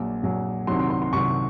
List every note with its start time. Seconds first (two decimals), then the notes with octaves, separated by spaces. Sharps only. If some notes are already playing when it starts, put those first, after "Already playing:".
Already playing: A#1 A#2 F#3
0.23 A#1 A#2 F#3
0.67 C2 C3 D#3 F#3 C6
0.79 C6
0.90 C6
1.02 C6
1.13 C2 C3 D#3 F#3 C#6